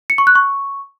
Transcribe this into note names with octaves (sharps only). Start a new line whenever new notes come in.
C#7
C#6
F#6
C#6